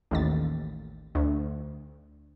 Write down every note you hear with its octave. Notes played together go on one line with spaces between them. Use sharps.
A1 D#2 A6
D2